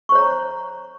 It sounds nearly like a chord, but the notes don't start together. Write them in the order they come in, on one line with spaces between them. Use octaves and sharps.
C#6 C5 C#5 A#5